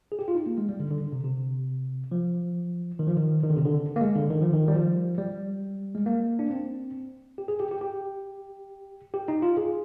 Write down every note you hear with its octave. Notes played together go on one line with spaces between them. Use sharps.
G#4
G4
F4
D#4
A#3
G#3
G3
D3
D3
D3
C3
C3
F3
D#3
F3
D#3
D#3
D3
C3
D3
A#3
G#3
D3
D#3
F3
D#3
G3
F3
G3
G#3
A#3
D4
C4
G4
G#4
G4
G4
G4
G4
D#4
F4
G#4